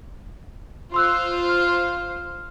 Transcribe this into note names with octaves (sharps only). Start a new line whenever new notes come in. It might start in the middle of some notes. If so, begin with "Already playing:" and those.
F4 C5 C6 E6 F#6
F6